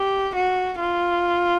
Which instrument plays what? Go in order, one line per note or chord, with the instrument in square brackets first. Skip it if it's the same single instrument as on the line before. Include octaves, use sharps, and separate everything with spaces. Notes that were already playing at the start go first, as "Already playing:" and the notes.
Already playing: [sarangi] G4
F#4
F4